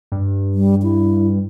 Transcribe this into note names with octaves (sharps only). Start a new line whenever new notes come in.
G2
G3
E4